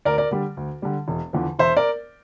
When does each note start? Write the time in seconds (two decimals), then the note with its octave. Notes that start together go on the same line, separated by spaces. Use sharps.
0.05 D2 A#4 D5
0.18 A#4 D5
0.31 D3 G3
0.57 D2
0.82 D3 G3
1.08 E1
1.33 E2 D3 F3
1.59 E1 C5 E5
1.77 A#4 D5